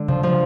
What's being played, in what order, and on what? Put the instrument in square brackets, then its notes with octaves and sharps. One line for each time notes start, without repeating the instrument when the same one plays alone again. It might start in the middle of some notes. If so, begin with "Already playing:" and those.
Already playing: [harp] D3 [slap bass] G#3
[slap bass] C#3 [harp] F3
[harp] F3